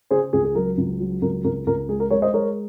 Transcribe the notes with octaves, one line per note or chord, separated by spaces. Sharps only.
C#3 G#4 C5
C#2 G#4
G#4
F#3 A#4
C#2
F#3
C#2 A#4
C#2 A#4
C#2 A#4
G#3 G#4
A#4
G#3 A#4 C#5
C5 D#5
G#3 A#4 C#5